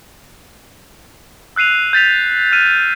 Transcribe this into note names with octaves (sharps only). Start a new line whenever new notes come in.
E6 F#6 C7 D#7 F7
G6 A6 B6 F7
F6 D#7